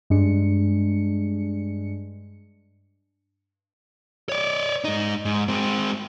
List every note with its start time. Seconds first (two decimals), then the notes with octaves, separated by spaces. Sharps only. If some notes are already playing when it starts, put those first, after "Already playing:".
0.10 G2 G#3 D4 C#7
4.29 C#5 D5
4.84 G#2 D#4
5.25 G#2
5.48 G#3 C4